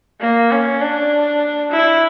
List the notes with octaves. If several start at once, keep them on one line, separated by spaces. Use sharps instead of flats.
A#3
C#4
D4
E4